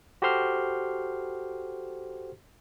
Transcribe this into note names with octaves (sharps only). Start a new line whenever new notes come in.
F#4 G4 A4 C5 C6 F6